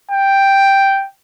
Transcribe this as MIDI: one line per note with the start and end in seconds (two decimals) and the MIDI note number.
0.11 1.07 79